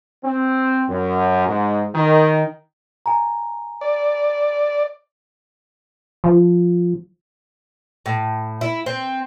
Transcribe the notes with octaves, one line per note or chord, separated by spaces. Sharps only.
C4
F#2
G#2
D#3
G#5 A#5
D5
F3
A2
E4
C4